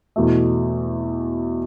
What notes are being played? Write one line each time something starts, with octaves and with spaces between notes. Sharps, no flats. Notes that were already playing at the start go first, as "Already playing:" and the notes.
E2 B2 A3